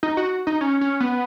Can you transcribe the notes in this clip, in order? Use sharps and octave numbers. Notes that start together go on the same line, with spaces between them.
D#4
F#4
D#4
C#4
C#4
B3